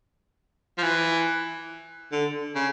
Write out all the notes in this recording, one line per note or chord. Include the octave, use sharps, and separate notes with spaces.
F3
E3
D3
C#3